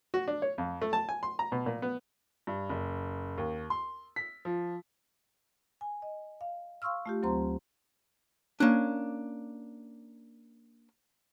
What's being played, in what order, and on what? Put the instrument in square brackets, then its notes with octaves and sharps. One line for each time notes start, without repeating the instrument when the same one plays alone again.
[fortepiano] F#4
D4
C#5
F2
A3
A5
G#5
C6
A#5
B2
A#2
B3
[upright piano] G2
F#1
D#2
C6
B6
F3
[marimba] G#5
D#5
F5
F5 C6 C#6 E6 F6
A3 F4 G4
D2 F#3 C4 C5 A#5 C6
[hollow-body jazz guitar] A#3 C#4 D4